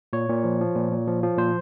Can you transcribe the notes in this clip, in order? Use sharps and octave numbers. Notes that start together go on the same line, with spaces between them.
A#2 C#5
A#2
F3
F3
A#2
A#2
F3
F3
A#2 C5